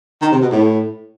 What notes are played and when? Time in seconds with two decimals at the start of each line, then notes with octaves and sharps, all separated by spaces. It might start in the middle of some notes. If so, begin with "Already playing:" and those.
0.22 D#3
0.32 C3
0.41 B2
0.51 A2